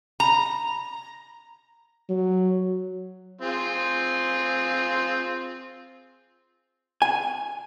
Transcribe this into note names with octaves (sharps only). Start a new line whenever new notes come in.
A#5
F#3
C4 F4 G#4
G#5